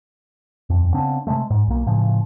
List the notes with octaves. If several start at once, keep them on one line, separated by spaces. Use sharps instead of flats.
D#1 F2
C#3 B3 C4 D4
C3 E3 G#3 A3
G#2
B1 A#3
A2 C#3 F3